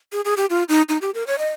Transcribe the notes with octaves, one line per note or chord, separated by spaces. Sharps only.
G#4
G#4
G4
F4
D#4
D#4
G4
A#4
C#5
D#5